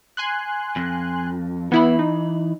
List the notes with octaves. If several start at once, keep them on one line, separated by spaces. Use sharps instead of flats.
G#5 C6 F#6
F2
E3 B3 E4 B5
D#4